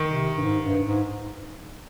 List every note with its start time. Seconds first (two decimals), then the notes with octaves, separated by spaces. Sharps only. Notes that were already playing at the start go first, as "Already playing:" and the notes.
Already playing: D#3
0.09 C3
0.37 G2
0.43 G#2
0.64 G2
0.86 G#2